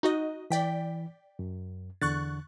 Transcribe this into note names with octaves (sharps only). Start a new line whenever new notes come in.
D#4 F#4 D#5
E3 D5 G5 B6
F#2
E2 D3 C#6 F#6 A6